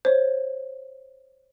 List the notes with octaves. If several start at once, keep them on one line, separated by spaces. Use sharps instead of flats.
C5 C#5